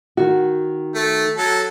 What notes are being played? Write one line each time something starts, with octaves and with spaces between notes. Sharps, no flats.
D#3 F#4
A3
F#3 A4